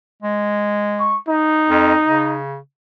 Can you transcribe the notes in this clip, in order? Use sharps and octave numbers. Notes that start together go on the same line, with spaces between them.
G#3
C#6
D#4
F2
C#3